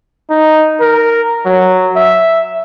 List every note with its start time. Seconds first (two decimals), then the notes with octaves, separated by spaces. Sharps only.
0.30 D#4
0.80 A#4
1.46 F#3
1.96 E5